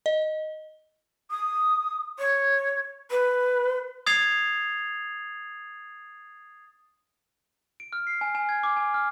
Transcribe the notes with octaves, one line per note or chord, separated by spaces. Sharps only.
D#5
D#6
C#5
B4
D#6 G#6 A6 C7 F7
D7
F6
C7
G#5
G#5
G#6
D6
G#5
F6